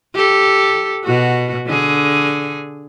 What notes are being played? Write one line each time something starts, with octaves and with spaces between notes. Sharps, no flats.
G4 A4
B2 F#4
D3 G#4